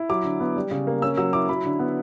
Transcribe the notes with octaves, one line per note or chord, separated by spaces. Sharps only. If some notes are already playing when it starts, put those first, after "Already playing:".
Already playing: E4
F#3 D6
D3
B3
G3
C#3
A#3
C#4 E6
F#3 E6
E4 D6
F#3 B5
D3
B3